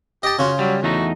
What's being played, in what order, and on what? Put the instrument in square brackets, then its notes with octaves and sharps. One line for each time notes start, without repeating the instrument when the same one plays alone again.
[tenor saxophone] G4 [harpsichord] D#5 A5
[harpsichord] C#3 F4 [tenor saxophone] F#4
[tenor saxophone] F#3 [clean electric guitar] G3
[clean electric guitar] E2 A3 D#4 [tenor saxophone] F#4